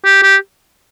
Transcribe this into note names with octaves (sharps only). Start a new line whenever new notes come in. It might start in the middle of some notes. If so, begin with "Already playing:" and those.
G4
G4